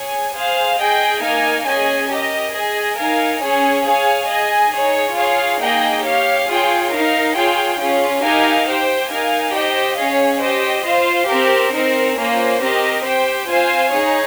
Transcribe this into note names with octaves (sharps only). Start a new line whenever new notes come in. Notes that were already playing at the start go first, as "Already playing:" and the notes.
Already playing: G#4 C#5 G#5
G#4 C5 F5
G#4 D#5 G5
A#3 D#4 A#4 F5 G#5
C#4 G#4 D#5 G#5
G4 A#4 D#5
G#4 D#5 G#5
D#4 A#4 F5 G#5
C#4 G#4 C#5 G#5
G#4 C#5 F5 G#5
G#4 D#5 G#5
D#4 G#4 C#5
F4 G#4 C#5 F5
A#3 D#4 G#4 D#5 G5
G4 C#5 F5
F4 G#4 C#5 G5
D#4 A#4 F5
F4 G#4 C#5 G5
C#4 F4 G#4
D#4 G4 A#4 F5 G#5
G4 C5 G5
D#4 A#4 F5 G#5
G4 C5 D#5 G5
C#4 G#4 C#5 F5
G4 C5 D#5 G5
F4 C5 F5
C4 G4 A#4
C4 D#4 A#4
A#3 C#4 F4 C5
C4 G4 A#4 D#5
G4 C5 G5
C4 F4 C5 F5 G#5
D#4 G#4 C#5